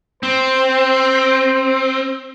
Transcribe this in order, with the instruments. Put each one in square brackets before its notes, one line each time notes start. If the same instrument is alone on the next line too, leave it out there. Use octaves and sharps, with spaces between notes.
[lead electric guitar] C4 [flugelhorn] C5